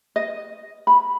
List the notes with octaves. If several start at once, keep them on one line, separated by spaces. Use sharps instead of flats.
D#5
B5